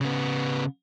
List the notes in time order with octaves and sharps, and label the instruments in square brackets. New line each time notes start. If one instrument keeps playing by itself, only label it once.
[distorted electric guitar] C#3 B3